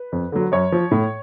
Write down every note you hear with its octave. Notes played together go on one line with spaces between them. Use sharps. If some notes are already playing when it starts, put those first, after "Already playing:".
Already playing: B4
F2
D3 F#3
F#2 C#5
F3
A2